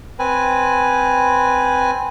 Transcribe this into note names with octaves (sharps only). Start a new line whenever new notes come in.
C4 B4 G#5